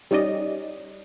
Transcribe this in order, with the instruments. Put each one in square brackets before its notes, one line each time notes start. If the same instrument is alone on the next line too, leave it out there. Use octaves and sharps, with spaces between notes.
[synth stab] G3 C#4 D#4 D5 D#5